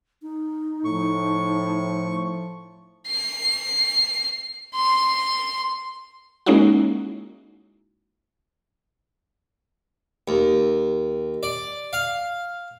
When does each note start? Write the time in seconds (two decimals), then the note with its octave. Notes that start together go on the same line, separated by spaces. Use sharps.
0.22 D#4
0.84 A2 F3 C#6
3.07 C7
4.75 C6
6.46 G#3 A#3 C#4 D#4 E4 F#4
10.28 D#2
11.43 D5
11.93 F5